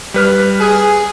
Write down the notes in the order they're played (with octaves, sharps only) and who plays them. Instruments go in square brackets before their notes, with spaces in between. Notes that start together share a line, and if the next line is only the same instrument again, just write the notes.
[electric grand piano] G3 B4 F6
[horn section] G#4